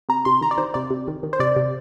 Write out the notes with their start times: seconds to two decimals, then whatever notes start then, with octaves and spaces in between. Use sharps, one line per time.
0.09 C3 A#5
0.25 C3 C6
0.41 D#3 A#5
0.51 D5
0.58 D#3 C5
0.74 C3 D5
0.90 C3
1.08 D#3
1.23 D#3
1.33 C5
1.40 C3 D5
1.56 C3